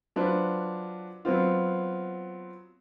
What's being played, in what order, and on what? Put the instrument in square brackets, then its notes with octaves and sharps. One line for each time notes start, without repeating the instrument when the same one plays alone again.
[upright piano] F#3 D4 F4 B4 C5
F#3 B3 C4 F4